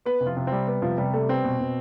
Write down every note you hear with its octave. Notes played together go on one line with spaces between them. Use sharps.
B3 B4
C3
F3 F4
C3
G3 C4
B3
C3 F3 F4
C3 G3 G4
G3 A3 A4
B3 C4
B2
B2